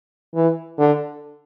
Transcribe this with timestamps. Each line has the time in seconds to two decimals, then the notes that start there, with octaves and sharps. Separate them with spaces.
0.35 E3
0.79 D3